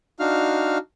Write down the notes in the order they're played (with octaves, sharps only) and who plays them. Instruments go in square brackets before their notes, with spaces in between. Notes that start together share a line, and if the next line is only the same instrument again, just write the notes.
[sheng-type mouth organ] D4 D#4 F#4 F5 F6